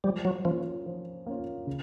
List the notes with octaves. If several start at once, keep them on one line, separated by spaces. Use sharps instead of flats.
F3 G3
F#3
F3 A#3 C#4 F4
F3
A#3 C#4 F4
C#3